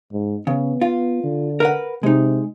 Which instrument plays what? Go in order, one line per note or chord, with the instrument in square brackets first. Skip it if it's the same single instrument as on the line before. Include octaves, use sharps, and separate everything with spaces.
[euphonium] G#2
[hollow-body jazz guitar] C#3 [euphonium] B3
[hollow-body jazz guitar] F4
[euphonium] D3
[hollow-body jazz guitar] A#4 B4 F#5
[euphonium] C3 [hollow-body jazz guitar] G#3 D#4